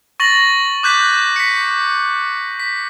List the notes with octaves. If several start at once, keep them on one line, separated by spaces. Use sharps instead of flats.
C#6 A6 A#6 F#7
D6 F#6 G6 B6
B6 C#7
B6